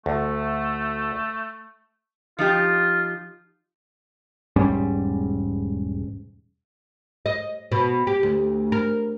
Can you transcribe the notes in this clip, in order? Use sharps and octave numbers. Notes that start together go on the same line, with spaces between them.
D2 A3
F3 D#4 F4 G4
E1 G#2 G3 C#4
D#5
B2
G4
D2
A#4